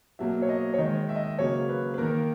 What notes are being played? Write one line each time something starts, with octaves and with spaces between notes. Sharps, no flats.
B2 F#3 A#3 E5
C#5
D#5
C#5
D#3 G#3 D#5
E5
D#5
E5
C#3 F#3 A#3 C#5
B4
B4
D#3 A#3 A#4